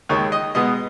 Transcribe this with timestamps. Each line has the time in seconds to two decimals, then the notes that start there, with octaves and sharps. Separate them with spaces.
0.09 D#2 D#3 G#3 C#5
0.32 D#5
0.55 B2 G#3 B3 D#5